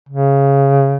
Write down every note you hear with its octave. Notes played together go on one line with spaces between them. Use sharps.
C#3